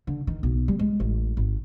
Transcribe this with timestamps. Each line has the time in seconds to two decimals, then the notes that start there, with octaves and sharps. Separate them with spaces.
0.07 D3
0.27 D#3
0.43 B1
0.68 G3
0.79 G#3
1.00 A1
1.37 G#1